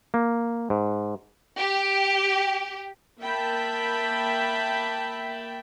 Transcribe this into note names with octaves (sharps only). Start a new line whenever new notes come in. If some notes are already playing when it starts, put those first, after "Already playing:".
A#3
G#2
G4
A#3 E5 G5 A5 B5